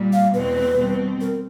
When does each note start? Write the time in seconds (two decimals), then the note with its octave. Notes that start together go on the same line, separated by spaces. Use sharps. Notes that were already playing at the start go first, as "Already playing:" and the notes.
Already playing: A#2 G3 A#3
0.13 F5
0.34 E2 B2 G#3 C4 B4
0.77 B2 G3 C4
1.21 A#4